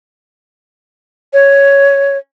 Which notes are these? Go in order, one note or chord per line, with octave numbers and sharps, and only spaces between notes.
C#5